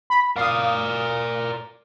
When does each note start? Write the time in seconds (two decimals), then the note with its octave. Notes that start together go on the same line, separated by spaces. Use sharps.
0.10 B5
0.36 A#4 D5 F5 D#6